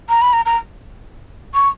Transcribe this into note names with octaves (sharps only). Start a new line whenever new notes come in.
A#5
B5
A#5
A#5
C#6